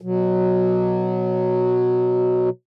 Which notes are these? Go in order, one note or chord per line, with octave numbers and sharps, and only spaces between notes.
B2 F#3